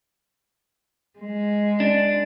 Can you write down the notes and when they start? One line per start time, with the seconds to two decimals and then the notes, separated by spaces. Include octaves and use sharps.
1.19 G#3
1.80 D4